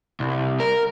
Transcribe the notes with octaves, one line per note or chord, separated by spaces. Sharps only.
C2
A#4